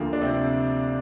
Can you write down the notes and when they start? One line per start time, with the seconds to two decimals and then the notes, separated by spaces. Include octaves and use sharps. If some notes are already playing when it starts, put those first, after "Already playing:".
Already playing: D2 D3 F3 A#3
0.13 D4
0.21 C3 C4